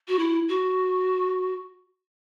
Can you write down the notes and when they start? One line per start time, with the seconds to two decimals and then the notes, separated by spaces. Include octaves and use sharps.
0.08 F#4
0.19 E4
0.49 F#4